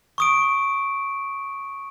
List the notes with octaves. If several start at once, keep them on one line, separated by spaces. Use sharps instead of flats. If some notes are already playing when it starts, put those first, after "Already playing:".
C#6 D#6 D7